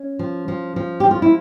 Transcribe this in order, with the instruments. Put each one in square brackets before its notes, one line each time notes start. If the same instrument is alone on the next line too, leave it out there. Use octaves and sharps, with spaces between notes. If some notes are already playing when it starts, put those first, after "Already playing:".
Already playing: [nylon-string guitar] C#4
F3
F3
F3
F3 G4
F4
E4